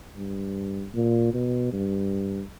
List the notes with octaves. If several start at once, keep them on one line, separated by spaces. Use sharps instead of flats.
G2
A#2
B2
G2